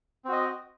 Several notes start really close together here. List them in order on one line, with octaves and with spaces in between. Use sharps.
C4 F#4 D#5